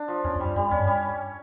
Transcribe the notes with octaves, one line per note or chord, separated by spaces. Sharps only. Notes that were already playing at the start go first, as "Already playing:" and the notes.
Already playing: D4
F3
E2 C#4
E2
F2 G3
F2 G3
E2 C#4
G2
G3